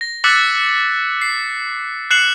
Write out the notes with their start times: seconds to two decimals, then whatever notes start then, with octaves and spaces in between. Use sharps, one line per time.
0.01 A#6
0.24 D6 E6 F#6 A6 B6 C#7
1.21 C7
2.11 F#6 C7 C#7 E7 F#7